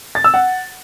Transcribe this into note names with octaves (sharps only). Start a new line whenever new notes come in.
A6
E6
F#5